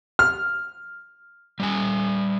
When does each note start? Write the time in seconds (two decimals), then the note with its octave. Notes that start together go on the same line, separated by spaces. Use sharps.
0.19 F6
1.60 G3 C#4 G#5